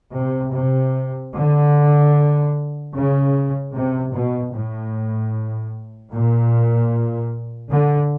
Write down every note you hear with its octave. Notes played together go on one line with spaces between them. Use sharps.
C3
C3
D3
C#3
C3
B2
A2
A#2
D3